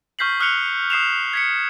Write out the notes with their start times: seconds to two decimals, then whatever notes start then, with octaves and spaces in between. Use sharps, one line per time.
0.19 C#6 F6 G6 B6 C7 F#7
0.40 D#6 F6 F#6 C#7 F7 G7
0.90 D#6 C7 E7 F7
1.33 G#6 B6 C#7